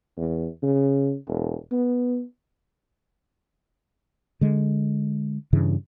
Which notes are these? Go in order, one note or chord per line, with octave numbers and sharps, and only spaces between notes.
E2
C#3
E1
B3
D3 G#3
G2 C#3 E3